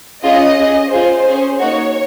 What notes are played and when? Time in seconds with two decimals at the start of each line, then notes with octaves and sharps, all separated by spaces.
0.24 C#4 F4 G#4 D#5
0.58 C#4 G#4
0.91 C#4 F4 G#4 C5
1.26 C#4 G#4
1.59 A#3 D#4 F#4 C#5